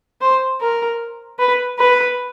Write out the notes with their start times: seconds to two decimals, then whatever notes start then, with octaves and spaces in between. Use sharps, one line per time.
0.21 C5
0.61 A#4
1.39 B4
1.79 B4